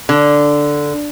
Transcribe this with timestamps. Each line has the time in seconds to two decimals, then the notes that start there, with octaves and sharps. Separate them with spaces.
0.09 D3